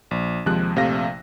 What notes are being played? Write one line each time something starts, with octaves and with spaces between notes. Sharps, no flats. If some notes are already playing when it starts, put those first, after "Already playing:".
A#1
D#2 C3 F3 G#3 F#6
A#1 C3 A3 F5 A#6